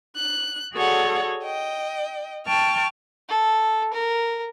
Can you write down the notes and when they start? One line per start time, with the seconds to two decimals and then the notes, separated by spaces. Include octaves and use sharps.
0.17 F#6
0.73 F#4 G#4 A4 C#5 D5 F#5
1.43 D#5 G5
2.47 G5 A5 C#6 F6
3.29 A4
3.93 A#4